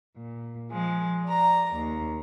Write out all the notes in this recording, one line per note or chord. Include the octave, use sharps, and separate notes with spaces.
A#2
F3 G#3
D5 A#5
D#2